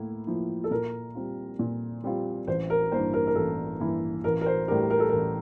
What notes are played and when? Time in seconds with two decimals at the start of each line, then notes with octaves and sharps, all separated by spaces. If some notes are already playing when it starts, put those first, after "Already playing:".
Already playing: A2 A#3 E4
0.27 F3 A#3 E4
0.64 A4
0.71 A#2 A#4
1.15 G3 C4 F4
1.59 A#2
2.04 G3 C4 F4
2.47 A1 C5
2.70 A#4
2.92 G2 E3 A#3 E4 C5
3.13 A#4
3.27 A#4
3.35 A1 A4
3.79 G2 E3 A#3 E4
4.24 A1 A#4
4.41 A#4
4.46 C5
4.68 A2 G3 D4 G4 A#4
4.90 A#4
5.00 A4
5.09 A1 A#4